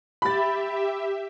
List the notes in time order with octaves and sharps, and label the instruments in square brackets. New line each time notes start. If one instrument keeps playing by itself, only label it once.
[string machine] G4 E5 [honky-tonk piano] B5 A6